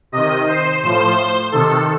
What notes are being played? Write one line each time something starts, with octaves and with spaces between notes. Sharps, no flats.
C3 D#3 D#5
C5
A2 F3 C5
C3 D#3 A4